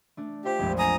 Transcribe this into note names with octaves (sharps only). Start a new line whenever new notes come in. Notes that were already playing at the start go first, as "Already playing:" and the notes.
A3 D4
F4 G4 C5 E5
A#1 F2 G#3
G#5 A#5 D#6